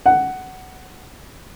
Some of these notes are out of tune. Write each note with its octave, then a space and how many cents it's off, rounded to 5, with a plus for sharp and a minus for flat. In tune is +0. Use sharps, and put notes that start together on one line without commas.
F#5 +10